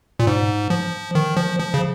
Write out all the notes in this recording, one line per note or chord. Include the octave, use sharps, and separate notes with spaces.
A#2
G#2
F3
D#3
F3
F3
C#3